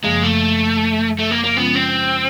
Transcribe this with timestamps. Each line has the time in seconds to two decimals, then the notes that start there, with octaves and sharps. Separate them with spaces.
0.03 F#2 C#3 F3 G#3 A#3
0.23 A3
1.19 A3
1.31 A#3
1.44 A#3
1.56 C#3 F3 G#3 B3 C#4 F4
1.75 C4